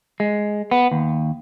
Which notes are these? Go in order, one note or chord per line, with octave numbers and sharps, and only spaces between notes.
G#3
B3
D#2